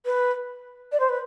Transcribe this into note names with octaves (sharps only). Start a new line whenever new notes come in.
B4
D5
C5
B4